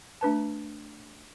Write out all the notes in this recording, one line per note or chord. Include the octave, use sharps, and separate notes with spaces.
A3 D4 B4 A5